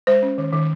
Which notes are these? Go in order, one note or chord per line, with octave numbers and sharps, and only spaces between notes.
G#3 C5
C#4
D#3
D#3